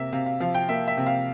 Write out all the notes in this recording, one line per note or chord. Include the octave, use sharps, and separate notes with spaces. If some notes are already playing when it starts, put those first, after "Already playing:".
Already playing: C3 A#3 E5
C3 F5
F5
F3 F5
G5
A#3 E5
E5
C3
F5